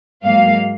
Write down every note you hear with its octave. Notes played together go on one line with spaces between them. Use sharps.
G#2 F#3 A#3 F5